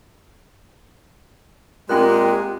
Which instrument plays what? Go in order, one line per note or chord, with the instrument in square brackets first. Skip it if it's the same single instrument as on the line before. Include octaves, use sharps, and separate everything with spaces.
[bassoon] A#2 [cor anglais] G#3 [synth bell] C4 G5 F#6 [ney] G4